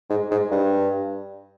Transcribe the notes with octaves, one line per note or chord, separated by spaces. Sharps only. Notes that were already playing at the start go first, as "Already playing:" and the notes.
G#2
G#2
G2